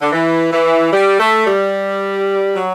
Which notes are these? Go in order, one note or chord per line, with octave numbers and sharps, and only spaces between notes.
D3
E3
E3
G3
A3
G3
F#3